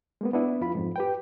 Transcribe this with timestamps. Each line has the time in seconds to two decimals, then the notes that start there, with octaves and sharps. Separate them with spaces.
0.21 G#3 A#3 B3
0.34 B3 D4 E4
0.61 F2 F4 B5
0.75 F2 G#2
0.96 G4 B4 G5